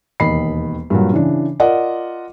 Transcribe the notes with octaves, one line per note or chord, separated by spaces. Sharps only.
E1 D#2 D#5 B5 C7
G2 A#2 F#3
C#3 E3 D4
F4 A#4 D5 D#5 F#5